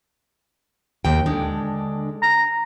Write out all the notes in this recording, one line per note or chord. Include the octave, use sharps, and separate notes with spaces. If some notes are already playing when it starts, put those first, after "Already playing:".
D#2 G5
D3 G#3 D4
A#5